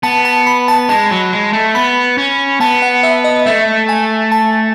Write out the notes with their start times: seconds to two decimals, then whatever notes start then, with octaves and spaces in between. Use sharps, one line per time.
0.03 B3 A5
0.25 A5
0.47 B5
0.68 A5
0.89 G#3 A5
1.11 F#3
1.33 G#3
1.53 A3
1.75 B3 B5
2.18 C#4
2.60 B3 A5
2.82 F#5
3.03 E5
3.24 D#5
3.46 A3 E5
3.89 G#5
4.32 A5